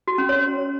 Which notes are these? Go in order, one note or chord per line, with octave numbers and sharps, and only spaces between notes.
F#4
C#4
C#5